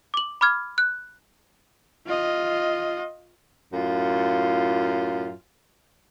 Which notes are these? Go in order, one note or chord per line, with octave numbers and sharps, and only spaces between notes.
D6 F#7
B5 D6 F6 G#6
F#6
F4 D#5
F#2 A2 F4